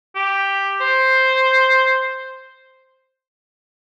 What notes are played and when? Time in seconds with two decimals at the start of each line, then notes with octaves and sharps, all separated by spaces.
0.16 G4
0.81 C5